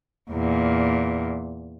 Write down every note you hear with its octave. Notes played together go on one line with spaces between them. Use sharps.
E2 A#2